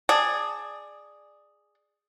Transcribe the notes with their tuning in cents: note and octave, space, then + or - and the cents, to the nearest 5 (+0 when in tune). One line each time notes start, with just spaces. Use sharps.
G#4 +0 D5 +20 A5 +0